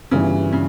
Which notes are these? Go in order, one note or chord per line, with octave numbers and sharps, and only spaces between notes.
G1 G2 C#3 E3
C#3